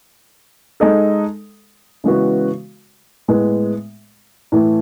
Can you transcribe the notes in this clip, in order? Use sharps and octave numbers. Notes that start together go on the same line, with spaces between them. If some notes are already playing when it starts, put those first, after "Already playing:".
G#3 D#4 A4
C#3 E3 G#3 B3 F#4
A2 G#3 B3
A2 E3 A3